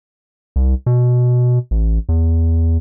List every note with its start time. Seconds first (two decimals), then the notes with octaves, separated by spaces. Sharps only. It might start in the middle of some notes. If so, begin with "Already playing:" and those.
0.56 C2
0.86 B2
1.71 A1
2.09 E2